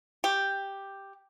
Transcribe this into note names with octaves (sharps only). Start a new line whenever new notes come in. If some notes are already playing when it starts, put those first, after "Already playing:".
G4